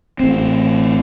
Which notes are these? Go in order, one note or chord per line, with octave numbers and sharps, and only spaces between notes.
A1 C4